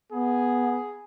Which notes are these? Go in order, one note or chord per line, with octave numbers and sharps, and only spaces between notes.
B3 G#4